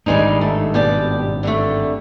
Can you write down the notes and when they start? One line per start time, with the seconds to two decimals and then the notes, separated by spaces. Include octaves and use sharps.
0.06 G#1 G2 G3 G#3 D#4
0.41 A3
0.74 B2 G4 D5
1.43 D3 G3 A3